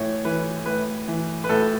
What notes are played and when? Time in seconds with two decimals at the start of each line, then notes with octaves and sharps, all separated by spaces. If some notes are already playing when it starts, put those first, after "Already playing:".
Already playing: A2 E3 C#5
0.25 E3 B4
0.66 A2 B4
1.08 E3
1.44 B4
1.49 A2 A4